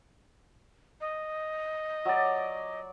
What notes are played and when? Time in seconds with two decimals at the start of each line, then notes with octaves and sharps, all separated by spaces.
1.01 D#5
2.05 F#3 D5